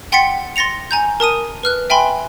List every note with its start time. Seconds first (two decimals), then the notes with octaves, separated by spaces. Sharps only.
0.12 F#5 G5 C6 A6 B6 C#7
0.56 C6 A6 A#6 C#7 F7
0.91 G#5 A#5 G6
1.20 A#4 A5 D#6 D#7
1.63 B4 F6 F#6
1.90 E5 G5 G#5 B5 C6